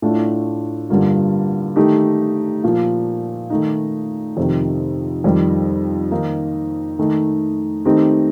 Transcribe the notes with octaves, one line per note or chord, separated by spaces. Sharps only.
A2 A3 D4 F4
G2 D3 G3 A#3 F4
D#3 A3 D#4 G4
A#2 F3 A#3
D#3 A3 D#4
F2 C3 D#3
F2 D#3 G3
D#3 A#3 D#4
D#3 A3 D#4
D#3 A3 C4 D#4 G4